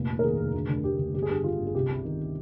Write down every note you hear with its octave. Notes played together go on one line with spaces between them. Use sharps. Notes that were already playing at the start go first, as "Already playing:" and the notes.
Already playing: F1 A#2
D#2
A#4
D#3 G#4
F1
D2
D3
D2 G4
D3
G1 G4
G#4
G2 G4
D3 F4
G1
G#4
C2 G4
C3
D#3